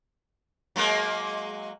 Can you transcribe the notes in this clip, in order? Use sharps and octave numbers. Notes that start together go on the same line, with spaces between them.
F#3 G#3 A#3